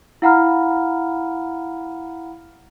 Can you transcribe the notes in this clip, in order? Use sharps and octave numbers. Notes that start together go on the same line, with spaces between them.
E4 F5 F#5 A#5 B5 F6